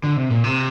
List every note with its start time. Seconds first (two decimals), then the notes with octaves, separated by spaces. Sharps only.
0.04 D3
0.16 C3
0.30 A#2
0.44 C3